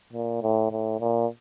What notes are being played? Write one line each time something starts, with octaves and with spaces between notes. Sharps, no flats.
A#2
A2
A2
A#2